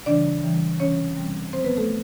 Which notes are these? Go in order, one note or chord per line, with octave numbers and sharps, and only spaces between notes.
C#3 E3 G3 D4 D5
C#3 E3 G3
C3 E3 G3 C4 C#4 C#5
C3 E3 G3 C4
D#2 D3 F3 G#3 C4 C5
B3 B4
A3 A4